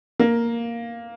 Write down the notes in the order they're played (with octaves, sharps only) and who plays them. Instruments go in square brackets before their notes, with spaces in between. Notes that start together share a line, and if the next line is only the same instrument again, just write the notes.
[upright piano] A#3